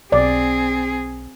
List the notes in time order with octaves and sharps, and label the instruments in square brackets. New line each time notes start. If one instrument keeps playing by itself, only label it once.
[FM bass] B1 [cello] C4 G#4 [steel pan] D5